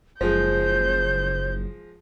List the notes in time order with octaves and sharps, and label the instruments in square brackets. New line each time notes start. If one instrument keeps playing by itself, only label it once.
[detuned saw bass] F#1 [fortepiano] F3 G#3 [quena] C5 [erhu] G6